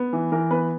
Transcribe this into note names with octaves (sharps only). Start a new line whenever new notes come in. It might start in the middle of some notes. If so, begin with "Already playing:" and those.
Already playing: B3
E3
E3 A#4
B3 B4